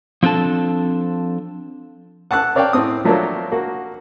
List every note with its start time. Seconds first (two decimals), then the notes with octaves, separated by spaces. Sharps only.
0.23 F3 C4 D4 A4 A5
2.31 F#5 A5 E6 F#6
2.55 A#4 C#5 D5 F5 G5 A5
2.73 A2 C4 D#6
3.05 F3 F#3 A3 A#3 D4 F4
3.52 A#3 F#4